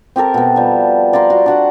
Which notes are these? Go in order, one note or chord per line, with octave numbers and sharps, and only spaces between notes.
C4 G4 A4 A#4
B2 B3
F3 G3
D5 F5 A#5 C6
F#4
D4 F#4 F#5